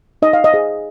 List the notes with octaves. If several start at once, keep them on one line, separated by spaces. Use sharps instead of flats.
D#4 D#5
F5
D#5
G#4 C5